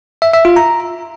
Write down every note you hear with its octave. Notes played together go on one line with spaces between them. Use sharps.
E5
E5
F4
A#5